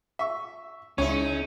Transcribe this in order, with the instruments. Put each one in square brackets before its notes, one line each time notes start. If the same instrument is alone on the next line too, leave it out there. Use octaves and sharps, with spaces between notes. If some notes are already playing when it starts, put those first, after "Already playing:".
[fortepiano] E5 C#6
[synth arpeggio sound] C#2 [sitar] C#3 D#4 E4 [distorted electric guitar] C#4 [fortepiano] C#5